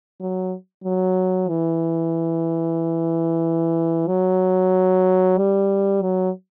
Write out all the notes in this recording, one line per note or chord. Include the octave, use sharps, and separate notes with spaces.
F#3
F#3
E3
F#3
G3
F#3